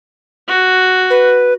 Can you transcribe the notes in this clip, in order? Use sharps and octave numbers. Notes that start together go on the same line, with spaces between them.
F#4
B4